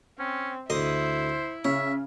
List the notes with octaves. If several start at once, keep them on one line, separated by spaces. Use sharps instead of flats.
C4 C#4
D2 E4 C5 D#5 C6
C#3 C#5 E5